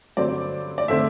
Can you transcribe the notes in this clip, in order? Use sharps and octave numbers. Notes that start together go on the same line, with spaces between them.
G2 D3 F#3 C4 D5
D5
D3 A3 C4 E5